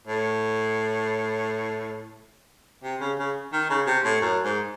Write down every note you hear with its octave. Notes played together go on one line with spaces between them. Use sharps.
A2
C3
C#3
C#3
D#3
C#3
C3
A2
F#2
G#2